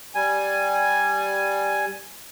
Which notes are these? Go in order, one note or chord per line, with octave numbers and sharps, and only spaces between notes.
G3 G#5